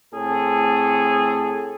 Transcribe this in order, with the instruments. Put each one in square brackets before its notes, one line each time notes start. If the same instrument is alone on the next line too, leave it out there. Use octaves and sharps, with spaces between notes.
[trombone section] A2 C4 G#4 A4